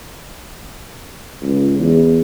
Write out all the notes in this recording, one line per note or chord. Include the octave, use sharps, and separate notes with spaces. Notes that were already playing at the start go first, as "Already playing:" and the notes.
C#2
E2